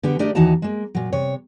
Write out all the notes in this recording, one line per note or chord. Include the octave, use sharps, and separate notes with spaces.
D3 B3 G4
A3 D4 G4 A#4 D5 D#5
D#2 E3 D#4 F#4 A5 A#5
G#3 A#3
A#2 F#3
C3 C#5